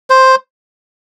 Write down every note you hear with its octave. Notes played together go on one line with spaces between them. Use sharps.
C5